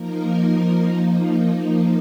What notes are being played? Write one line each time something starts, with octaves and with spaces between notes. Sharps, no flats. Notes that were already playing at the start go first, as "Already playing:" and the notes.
Already playing: F3 A#3 D#4 A#4
F3 A#3 D#4